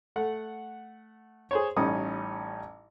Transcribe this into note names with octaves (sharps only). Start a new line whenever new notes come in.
A3 F#5
G#4 C5 C#5
A1 G3 C#4 D#4 D#6